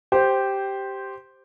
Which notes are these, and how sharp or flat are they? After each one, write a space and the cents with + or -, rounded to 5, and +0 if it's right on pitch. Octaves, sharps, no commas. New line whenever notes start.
G4 -5 C5 +0